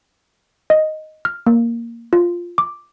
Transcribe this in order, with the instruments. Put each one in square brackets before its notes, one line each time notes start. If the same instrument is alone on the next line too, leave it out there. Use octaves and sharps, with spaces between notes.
[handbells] D#5
F6
A#3
F4
D6